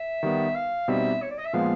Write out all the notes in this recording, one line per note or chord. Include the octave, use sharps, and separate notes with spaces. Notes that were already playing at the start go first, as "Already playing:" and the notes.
Already playing: E5
D#3 G3 B3
F5
B2 G3 C4 D#4 E5
C#5
D5
D#5
E5
A#2 F3 G#3 B3 F5